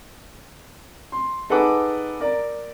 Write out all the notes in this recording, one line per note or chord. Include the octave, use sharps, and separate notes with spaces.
C6
D#4 G#4 A4 B4 F#5 D6
A#4 D5